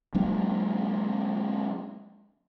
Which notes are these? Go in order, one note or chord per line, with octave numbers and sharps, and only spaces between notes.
F#3 G#3 A#3 D4